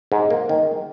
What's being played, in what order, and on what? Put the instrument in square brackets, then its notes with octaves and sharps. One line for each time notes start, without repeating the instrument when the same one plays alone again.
[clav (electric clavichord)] G#2
A#3
D#3